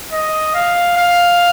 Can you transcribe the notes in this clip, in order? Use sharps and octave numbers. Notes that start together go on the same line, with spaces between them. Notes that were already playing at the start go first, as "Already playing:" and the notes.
D#5
F5
F5